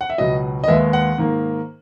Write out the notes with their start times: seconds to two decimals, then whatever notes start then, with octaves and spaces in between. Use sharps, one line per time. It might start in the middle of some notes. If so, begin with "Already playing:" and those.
0.01 F#5
0.10 E5
0.18 C#2 B2 F#3 D#5
0.64 D#5
0.67 D#2 D#3 G#3 B3 E5
0.93 F#5
1.18 G#2 D#3 A#3